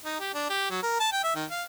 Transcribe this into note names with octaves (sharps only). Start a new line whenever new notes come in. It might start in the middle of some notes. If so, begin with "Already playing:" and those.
D#4
G4
D4
G4
F#3
A#4
A5
G5
E5
D#3
F5